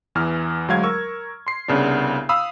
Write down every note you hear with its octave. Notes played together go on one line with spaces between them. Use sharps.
E2 E3 F6
D2 F#3 G#3 F5 G#6
A#4 C#6 E6
C6 C7
C2 C#3 B3 D4
F5 B5 D#6 E6